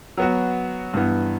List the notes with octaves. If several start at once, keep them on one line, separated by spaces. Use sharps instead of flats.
F#3 B3 F#4
G2 E3 B3